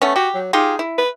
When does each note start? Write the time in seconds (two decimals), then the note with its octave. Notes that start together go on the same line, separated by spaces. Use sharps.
0.02 A3 B3 C#4
0.16 F#4 G4
0.34 F#3
0.53 D#4 F4 G4 G#4
0.79 E4
0.98 B4